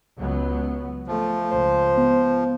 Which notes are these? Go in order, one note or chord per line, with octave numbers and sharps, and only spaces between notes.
C#2 F#3 B3
F3 A3
C#2 C5
B3